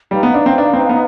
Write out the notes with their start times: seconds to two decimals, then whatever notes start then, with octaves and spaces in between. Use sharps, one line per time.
0.11 G3 D#4 B4 F5
0.23 B3
0.34 D4
0.46 C4
0.58 D4
0.74 C4
0.89 B3